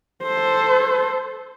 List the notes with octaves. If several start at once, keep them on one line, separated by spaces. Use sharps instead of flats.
A4 C5